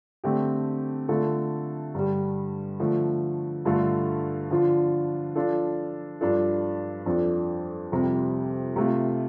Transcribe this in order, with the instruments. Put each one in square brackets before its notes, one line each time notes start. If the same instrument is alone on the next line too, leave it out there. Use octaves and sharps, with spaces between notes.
[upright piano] D3 A3 C4 G4
D3 A3 F4 A4
G2 D3 G3
D3 F3 A3
G2 D3 A3 F4 A4
D3 F3 D4 F4
F3 D4 F4 A4
G2 F3 D4 F4 A4
F2 F3 D4 A4
F2 C3 G3
C3 A3 F4